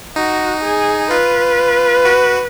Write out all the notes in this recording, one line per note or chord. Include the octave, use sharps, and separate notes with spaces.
D#4 F#4
G#4
F4 B4
F#4